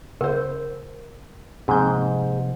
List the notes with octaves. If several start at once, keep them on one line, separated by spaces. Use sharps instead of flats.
C#3 A#4 C5
G#2 C3 F3 A#3 C4 G6